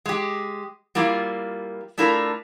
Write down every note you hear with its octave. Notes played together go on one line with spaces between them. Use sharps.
G#3 G4
G3 A#3 E4 F4
A3 D4 E4 F4 A4 A#4